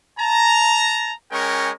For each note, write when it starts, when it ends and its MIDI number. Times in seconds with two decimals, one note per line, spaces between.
0.19 1.13 81
0.19 1.13 82
1.32 1.71 56
1.32 1.71 61
1.32 1.71 70
1.32 1.71 79
1.32 1.71 85